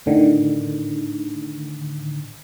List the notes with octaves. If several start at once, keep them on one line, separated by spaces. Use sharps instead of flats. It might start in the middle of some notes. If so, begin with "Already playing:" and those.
A2 D3 D#3